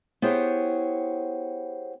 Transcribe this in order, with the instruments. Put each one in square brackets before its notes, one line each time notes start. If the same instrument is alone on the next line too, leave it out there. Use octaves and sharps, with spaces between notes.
[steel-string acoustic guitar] B3 E4 G4 G#4 C5 C#5